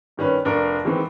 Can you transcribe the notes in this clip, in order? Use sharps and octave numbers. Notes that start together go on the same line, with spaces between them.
G2 D#3 C#4 B4
F1 D4 A#4 C#6
D#3 E3 G#3 B3 C4